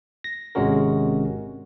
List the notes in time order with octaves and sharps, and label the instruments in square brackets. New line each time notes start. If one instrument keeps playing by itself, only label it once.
[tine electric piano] A#6
G#1 C3 G#3 C#4 F#4 A#4